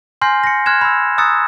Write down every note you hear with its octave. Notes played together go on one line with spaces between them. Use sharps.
G#5 C6 F6 G6 A#6 C7
A#6 C#7
C6 F6 F#6 G#6 E7
B5 E6
A#5 D#6 E6 F#6 A6 C#7